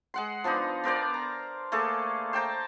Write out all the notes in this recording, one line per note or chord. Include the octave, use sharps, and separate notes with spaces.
G#3 F#5 C6
F3 B3 D4 D#4
B3 A#4 C5 D5
A#5
A3 A#3 G#4 A4
C5 G5 A5 A#5